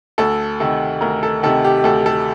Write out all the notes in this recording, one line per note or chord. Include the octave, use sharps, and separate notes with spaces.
D2 A4
C3 D#3 A4
D2 A#4
A4
C3 D#3 A4
G4
D2 A4
A4